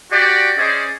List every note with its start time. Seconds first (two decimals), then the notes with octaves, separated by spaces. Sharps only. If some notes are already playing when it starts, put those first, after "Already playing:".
0.12 F#4 G4 D5
0.57 C#4 G#4 C5 D5 D#5